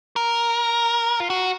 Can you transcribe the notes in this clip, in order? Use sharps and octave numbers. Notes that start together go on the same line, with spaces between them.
A#4
F4
F#4